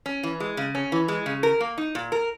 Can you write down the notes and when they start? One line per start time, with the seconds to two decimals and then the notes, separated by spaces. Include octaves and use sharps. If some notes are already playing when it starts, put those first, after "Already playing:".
0.06 C#4
0.23 E3
0.40 G#3
0.57 C#3
0.75 C#4
0.92 E3
1.08 G#3
1.26 C#3
1.43 A#4
1.61 A#3
1.78 D#4
1.95 A#2
2.12 A#4